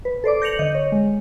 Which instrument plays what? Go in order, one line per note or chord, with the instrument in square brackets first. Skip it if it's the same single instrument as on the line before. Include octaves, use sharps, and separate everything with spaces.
[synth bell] B4
A4 C5 D5 D6
G6 A#6 C#7 F7 F#7
D3 D#5 G6
C#5
G#3